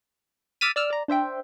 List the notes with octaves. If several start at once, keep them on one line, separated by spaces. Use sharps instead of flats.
D6 E6 F6 A6 B6 D#7
D5 E6 F6
D5 A#5
D4 C5 E5 G5